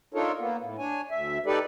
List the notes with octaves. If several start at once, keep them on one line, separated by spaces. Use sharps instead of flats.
D4 D#4 F4 A4 A#4 C#5
A#3 B3
A2
D4 C#5 G#5
D2 E5
D#4 G4 A4 B4 D5